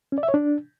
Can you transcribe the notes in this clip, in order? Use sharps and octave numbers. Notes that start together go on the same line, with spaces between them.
C#4
D5
E5
C#5
D4